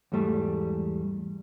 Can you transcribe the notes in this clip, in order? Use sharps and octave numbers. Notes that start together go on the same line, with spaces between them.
E2 G#2 G3 A3